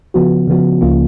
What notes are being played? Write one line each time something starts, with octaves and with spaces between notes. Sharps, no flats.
C#3 F3 B3 F#4
C#3 F3 B3 F#4
C#2 C#3 F3 A#3 F4